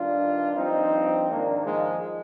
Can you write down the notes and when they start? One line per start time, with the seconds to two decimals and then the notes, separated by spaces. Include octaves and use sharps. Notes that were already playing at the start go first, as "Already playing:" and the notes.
Already playing: G2 D#3 D4 F4
0.56 G2 F3 C4 D#4
1.28 G#2 D#3 A#3 D4
1.65 F3 G#3